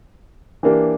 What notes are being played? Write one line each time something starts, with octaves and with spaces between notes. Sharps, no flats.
E3 A#3 D4 G4 A#4